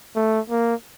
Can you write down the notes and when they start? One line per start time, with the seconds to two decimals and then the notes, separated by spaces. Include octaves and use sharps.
0.16 A3
0.50 A#3